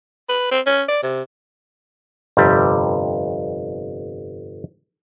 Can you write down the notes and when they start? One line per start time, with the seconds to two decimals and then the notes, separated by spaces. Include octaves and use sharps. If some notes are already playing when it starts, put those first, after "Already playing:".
0.29 B4
0.51 C4
0.66 C#4
0.88 D5
1.03 C3
2.37 G1 F2 C3 G3